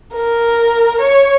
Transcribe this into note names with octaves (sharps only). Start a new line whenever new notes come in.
A#4
C#5